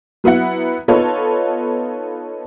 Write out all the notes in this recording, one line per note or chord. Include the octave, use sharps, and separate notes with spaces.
F#3 B3 E4 F#5
B3 D#4 F4 A4 B4 C#5